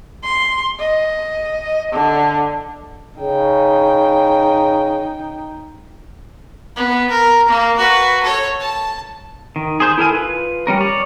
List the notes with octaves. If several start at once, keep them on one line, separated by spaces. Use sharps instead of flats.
C6
D#5
D3
C#3 D#4 G5
B3
A#4
A#3
F#4 B4
A4 C#5
A5
D#3
G#4 C5 G6
E4 A4 A#4 G#5
F4 B4
G3 C#4 A#4
C#5 D5